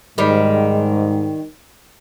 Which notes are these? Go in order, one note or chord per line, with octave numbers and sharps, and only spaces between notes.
G#2 D#3 G3